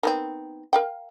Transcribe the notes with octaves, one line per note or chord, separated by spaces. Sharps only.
D#3 B3 C4
A#4 F5 G5